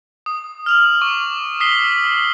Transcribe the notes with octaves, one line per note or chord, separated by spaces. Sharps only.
D#6
F6 F7 F#7
C#6 D6
D#6 E6 B6 C7 G7